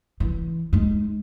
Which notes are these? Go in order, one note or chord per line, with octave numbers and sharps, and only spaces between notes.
E3
G#3 D#4